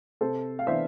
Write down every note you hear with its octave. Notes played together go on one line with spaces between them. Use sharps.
C3 A4 C5
F5
E3 B3 D4 C5 E5